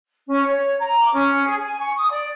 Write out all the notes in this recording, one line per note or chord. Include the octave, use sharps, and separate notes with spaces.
C#4
C#5
A#5
D6
C#4
G#4
G#5
C#6
D#6
D5